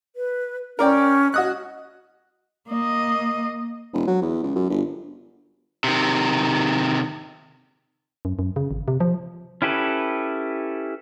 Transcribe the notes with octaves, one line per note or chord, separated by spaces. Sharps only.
B4
C#4 A#4 D5 G5
F#4 D#5 D#6 F#6
A#3 D#5
E1
F#3
E2
C#2
F#2
G1
C3 D#3
F#2
F#2
C#3
G#1
C3
F3
C#4 E4 G4 A4 B4